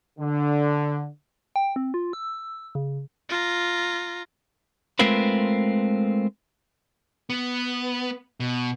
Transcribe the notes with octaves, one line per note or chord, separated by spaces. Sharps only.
D3
G5
C4
F4
E6
C#3
F4 A#5
G#3 A3 C4 F4 A#4 B4
B3
B2